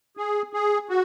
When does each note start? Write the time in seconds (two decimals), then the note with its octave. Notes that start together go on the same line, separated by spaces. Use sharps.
0.17 G#4
0.53 G#4
0.89 F#4